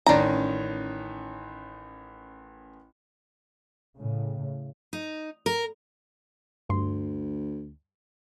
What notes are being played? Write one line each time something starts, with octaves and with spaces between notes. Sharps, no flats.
A1 D#3 C#4 D4 A#5
A2 C#3
D#4
A#4
D2 G2 C6